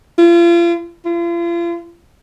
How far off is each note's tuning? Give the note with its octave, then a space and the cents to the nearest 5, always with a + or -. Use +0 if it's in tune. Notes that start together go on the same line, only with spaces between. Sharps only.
F4 -35
F4 -40